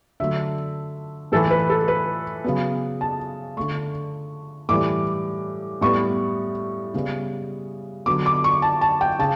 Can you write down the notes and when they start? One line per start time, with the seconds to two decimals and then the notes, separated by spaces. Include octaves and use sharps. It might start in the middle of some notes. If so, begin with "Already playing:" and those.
0.20 D3 F#3 A3 E5
1.32 A2 E3 A3 A4
1.51 B4
1.70 A4
1.88 B4
2.44 C#3 F#3 B3
3.01 A5
3.57 D3 A3 C#6
4.69 A2 E3 G3 D6
5.81 A2 G3 B3 C#6
6.94 C#3 G3 B3
8.06 D3 F#3 B3 D6
8.26 D6
8.44 C#6
8.62 A5
8.81 A5
9.01 G5
9.19 C#3 A5